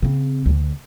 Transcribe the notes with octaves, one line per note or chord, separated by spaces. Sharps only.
C#3 C4
D2 D3